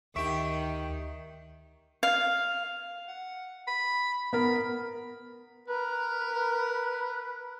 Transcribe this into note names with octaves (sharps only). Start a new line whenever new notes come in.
D2 D#3 G4 E5 C#6 D7
F5
F#5
B5
B3 A#4 B5
A#4 B4